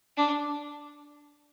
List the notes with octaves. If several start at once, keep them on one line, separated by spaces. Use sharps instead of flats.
D4